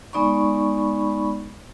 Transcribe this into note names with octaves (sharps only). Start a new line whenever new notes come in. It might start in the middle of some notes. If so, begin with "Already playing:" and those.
G#3 B3 D#4 D5 B5 C#6